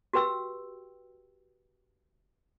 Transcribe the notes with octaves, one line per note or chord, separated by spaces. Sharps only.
F#4 G4 B4 G5 E6